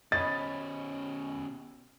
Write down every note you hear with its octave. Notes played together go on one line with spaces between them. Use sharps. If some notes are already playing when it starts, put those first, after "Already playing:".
B2 C#4 D#5 B5 A6